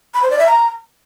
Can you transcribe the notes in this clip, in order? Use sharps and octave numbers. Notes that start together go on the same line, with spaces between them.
B5
C5
D5
E5
A#5